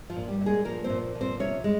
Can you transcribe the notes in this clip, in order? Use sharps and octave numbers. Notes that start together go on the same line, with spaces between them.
F3 F4
A#2
G3 G4
A#2
G#3 G#4
F3 A#3 A#4
C4 C5
A#2
F3
C4 C5
C3 C#4 C#5
G#3